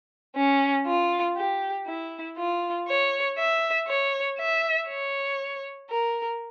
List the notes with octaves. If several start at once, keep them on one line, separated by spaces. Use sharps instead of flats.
C#4
F4
G4
E4
F4
C#5
E5
C#5
E5
C#5
A#4